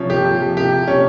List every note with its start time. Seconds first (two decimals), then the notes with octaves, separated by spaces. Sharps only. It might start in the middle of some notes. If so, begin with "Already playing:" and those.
Already playing: C3 F3 C#4
0.10 G4
0.25 F3
0.57 C3 G4
0.87 C3 C#4